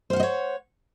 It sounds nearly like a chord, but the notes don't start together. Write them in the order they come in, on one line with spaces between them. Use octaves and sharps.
C5 F5 F#5 D#5 C#5